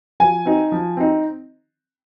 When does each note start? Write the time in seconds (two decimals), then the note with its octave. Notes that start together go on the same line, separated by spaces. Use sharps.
0.20 F3 G#5
0.45 C4 D#4
0.72 F3
0.97 C4 D#4